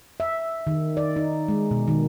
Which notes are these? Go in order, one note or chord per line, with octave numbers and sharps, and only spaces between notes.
E5
D#3
D5
D#4
G#3
B2
D#3